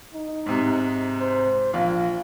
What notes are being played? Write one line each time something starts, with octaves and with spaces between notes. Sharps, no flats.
D#4
G#2 C3
C5
A#1 F4 F5